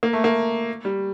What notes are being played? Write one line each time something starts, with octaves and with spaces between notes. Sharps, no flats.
A#3
A3
A#3
G3